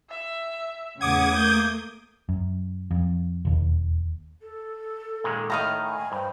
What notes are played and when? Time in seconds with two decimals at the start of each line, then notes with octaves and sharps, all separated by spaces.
0.10 E5
1.01 E2 A2 C#3 F#5 D6 D#6 G#6
1.35 A3 A#3 G6
2.29 F#2
2.91 F2
3.45 E1 D#2
4.41 A4
5.24 A#2 D#3 G#3
5.50 A2 D#3 D#5 F5 A#5
5.83 G#5
6.12 G2 C5